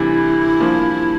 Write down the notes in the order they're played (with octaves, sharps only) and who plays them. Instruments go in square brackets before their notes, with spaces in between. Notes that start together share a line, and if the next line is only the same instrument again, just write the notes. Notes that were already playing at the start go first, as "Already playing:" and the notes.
Already playing: [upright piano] D2 C3 E3 G3 [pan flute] E4
[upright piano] G2 F3 A#3